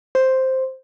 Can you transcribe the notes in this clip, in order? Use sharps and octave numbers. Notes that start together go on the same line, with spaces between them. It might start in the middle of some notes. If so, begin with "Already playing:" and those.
C5